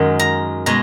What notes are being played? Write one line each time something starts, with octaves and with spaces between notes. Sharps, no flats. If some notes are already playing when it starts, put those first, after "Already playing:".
Already playing: F#2 D#3 G#3
A#5
B2 G#3 A#5